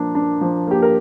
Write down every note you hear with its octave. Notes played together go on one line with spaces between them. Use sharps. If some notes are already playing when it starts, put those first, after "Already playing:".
Already playing: F3 A#3 D4
D4
F3
A#3 G4
A#4